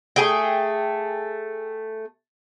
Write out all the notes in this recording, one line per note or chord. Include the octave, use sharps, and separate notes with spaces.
A3 G#4 G5